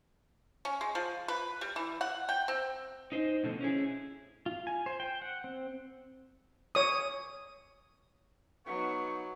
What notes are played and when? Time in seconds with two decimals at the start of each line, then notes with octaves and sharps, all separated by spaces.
0.65 C#4
0.81 G#3
0.95 F3
1.28 B4
1.61 G3
1.76 E3
2.01 F#5
2.29 G5
2.48 C4
3.12 D#4 C5
3.43 B2 D3 F3 A3 C4
3.61 C#4 E4 G#4
4.46 F4
4.67 G#5
4.86 C5
5.00 G5
5.22 F#5
5.44 C4
6.75 C#5 D#6
8.66 F#3 B3 D#4 C#6